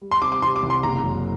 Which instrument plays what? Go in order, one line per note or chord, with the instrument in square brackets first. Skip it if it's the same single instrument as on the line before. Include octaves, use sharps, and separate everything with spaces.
[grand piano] G3
[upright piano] C6
[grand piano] C3 [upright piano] D6
[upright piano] D6
[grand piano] C3 [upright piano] C6
[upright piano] D6
[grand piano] C2
[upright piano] C6
[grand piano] F#1 [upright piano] A#5
[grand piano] F#2